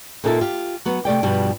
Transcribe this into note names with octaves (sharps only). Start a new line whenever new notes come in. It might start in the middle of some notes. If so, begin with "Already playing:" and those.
A#2 A#3 D#4 A4 E5 A5
F4 G4
F#3 B3
C3 A3 D5 G5
G2 B2 F3 G3